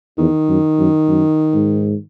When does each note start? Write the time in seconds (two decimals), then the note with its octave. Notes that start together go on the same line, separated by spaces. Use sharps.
0.18 E2 D#3
0.49 F#2
0.79 F#2
1.08 F#2
1.54 G#2